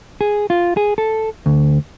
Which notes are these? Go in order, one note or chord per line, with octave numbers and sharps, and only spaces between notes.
G#4
F4
G#4
A4
D2